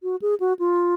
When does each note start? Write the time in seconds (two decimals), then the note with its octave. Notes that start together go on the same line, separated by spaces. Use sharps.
0.03 F#4
0.22 G#4
0.40 F#4
0.59 F4